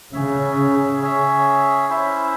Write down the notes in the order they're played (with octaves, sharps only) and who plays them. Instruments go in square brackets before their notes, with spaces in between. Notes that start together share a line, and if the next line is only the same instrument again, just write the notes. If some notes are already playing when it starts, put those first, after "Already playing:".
[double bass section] C#3 [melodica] C#4 G#4 C#5 E5
[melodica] C#4 G#4 C#5 E5
C#4 E4 C5 E5